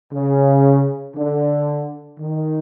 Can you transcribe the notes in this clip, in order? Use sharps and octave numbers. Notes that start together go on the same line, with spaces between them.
C#3
D3
D#3